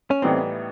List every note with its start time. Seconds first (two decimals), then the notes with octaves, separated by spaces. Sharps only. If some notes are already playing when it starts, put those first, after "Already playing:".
0.11 C#4
0.22 A2 E3 G3 B3 C4 D#4